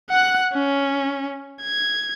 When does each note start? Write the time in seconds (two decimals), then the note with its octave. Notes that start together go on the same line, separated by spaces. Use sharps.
0.10 F#5 F#6
0.54 C#4
1.62 G#6